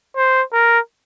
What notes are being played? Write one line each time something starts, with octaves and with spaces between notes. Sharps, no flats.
C5
A#4